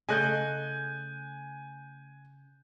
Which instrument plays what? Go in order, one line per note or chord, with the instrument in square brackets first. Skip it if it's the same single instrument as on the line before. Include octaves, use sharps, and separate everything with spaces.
[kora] C#3 A3 D#5 [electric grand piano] G#5 F#6 G6